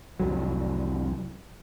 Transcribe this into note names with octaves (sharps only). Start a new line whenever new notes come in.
C2 F2 F#3